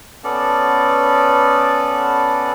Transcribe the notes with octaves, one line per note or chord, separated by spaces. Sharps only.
B3 C#4 A4 D5